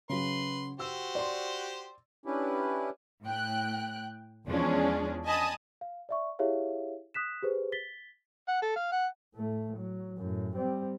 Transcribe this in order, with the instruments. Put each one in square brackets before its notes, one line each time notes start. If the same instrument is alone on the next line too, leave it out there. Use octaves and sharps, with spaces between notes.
[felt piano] C#3 F#3 [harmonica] B4 C6
[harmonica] F#4 G4 C5 [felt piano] E6
[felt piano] D5 C6
[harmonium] C#4 D4 E4 G4 B4
[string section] A2 G5 F#6
E2 F3 G#3 C#4 D4 G#4
D#5 G#5 A5 B5 D#6
[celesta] F5
D5 E5 C#6
E4 G4 G#4 C#5 E5 F5
D#6 F#6 B6 E7
G4 G#4 B4 C5
A6 B6 G7
[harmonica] F#5
A4
F5
F#5
[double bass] A2 A3
F#3
F#2 A2
G3 C4